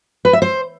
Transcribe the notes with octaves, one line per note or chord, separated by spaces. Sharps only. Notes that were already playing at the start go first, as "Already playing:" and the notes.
B4
E5
C5